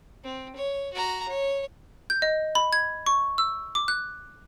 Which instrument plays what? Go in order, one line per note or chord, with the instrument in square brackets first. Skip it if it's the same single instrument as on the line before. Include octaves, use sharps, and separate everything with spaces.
[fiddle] C4
C#5
F#4 A#5
C#5
[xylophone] G6
D#5
B5
G#6
C#6
E6
D6
F#6